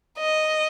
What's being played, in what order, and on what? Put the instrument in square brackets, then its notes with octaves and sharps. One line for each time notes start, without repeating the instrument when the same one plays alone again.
[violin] D#5